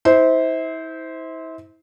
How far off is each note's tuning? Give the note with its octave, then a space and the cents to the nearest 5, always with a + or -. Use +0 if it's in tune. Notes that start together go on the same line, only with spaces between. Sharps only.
E4 -35 C5 -10